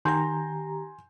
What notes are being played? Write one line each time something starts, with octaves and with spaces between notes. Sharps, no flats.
D#3 G4 G#5 A#5 C6 G6